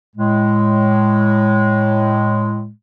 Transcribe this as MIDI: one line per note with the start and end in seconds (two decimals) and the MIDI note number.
0.16 2.70 45
0.16 2.70 56